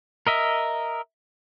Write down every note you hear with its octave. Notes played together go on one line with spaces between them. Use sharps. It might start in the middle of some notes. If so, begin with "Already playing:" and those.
A#4 D#5 E5